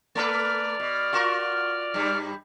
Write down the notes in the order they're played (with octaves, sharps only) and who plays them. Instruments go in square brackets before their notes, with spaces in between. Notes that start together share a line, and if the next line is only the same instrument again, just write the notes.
[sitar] A3 A4 B4 [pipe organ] D5 F6
[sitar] B2
F4 F#4 A#4
G2 G3